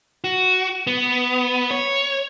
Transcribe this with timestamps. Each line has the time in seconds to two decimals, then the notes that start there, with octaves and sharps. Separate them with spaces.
0.24 F#4
0.87 B3
1.71 C#5